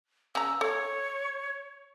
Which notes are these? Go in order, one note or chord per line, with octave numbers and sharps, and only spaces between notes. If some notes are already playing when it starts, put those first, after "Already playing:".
C#3 A#5 E6
A4 C#5